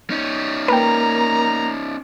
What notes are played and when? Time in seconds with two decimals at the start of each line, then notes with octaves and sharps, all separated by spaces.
0.10 C#4 D#4
0.68 A#3 B4 G5 A#5